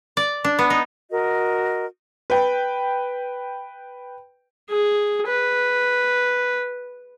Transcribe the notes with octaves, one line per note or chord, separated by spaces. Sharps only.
D5
D4
B3
D#4
F#4 A#4 D#5
B4 G5
G#4
B4